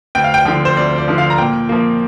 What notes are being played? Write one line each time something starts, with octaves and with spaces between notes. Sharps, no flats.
D2 G5
F5
G5
D3 F3 G5
C5
D2 D5
D5
D3 F3
F5
A#5
A#2 G5
F3 A#3